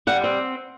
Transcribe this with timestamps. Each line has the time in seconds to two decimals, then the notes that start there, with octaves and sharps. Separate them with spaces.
0.07 G3 F#5
0.24 C4